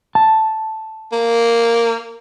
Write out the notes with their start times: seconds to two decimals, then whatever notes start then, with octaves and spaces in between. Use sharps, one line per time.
0.15 A5
1.12 A#3